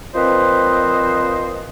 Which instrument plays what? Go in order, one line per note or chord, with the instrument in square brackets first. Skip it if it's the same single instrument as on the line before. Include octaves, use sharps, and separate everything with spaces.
[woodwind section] A#2 F3 C4 B4 C5 D#5